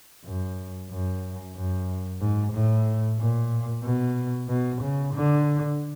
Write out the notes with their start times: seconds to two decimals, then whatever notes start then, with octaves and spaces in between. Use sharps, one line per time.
0.25 F#2
0.91 F#2
1.56 F#2
2.21 G#2
2.53 A2
3.19 A#2
3.84 B2
4.49 B2
4.82 C#3
5.15 D3